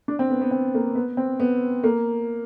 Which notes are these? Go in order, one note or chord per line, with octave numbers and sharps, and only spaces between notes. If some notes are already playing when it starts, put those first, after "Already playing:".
D4
C4
B3
B3
C4
A#3
B3
C4
B3
A#3